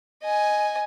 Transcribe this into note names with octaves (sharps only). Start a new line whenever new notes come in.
D#5 G#5